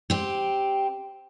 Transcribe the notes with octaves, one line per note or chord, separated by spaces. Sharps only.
C4 G4